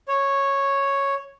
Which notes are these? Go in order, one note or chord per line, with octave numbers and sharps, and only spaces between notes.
C#5